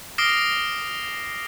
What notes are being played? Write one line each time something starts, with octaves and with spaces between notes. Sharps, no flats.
D6 D#6 F6 A#6 C7 D7